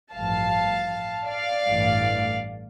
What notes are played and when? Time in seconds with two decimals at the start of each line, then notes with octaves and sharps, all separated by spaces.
0.14 A1 G2 F3 F5 A5
1.29 D5 F5
1.66 A1 G2 E3 A3